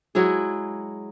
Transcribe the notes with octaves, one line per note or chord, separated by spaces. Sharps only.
F#3 G#3 E4 G#4